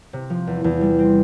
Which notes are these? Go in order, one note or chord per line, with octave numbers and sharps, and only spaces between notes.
C3
F3
E2
E2
G3
C4